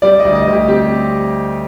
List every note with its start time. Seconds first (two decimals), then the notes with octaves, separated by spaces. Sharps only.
0.02 G3 D5
0.20 D#5
0.25 D2
0.35 D#5
0.46 D2
0.52 G4
0.68 C4 G4